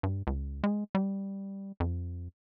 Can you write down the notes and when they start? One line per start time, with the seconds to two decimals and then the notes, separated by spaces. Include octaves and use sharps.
0.03 G2
0.27 C#2
0.64 G#3
0.95 G3
1.80 F2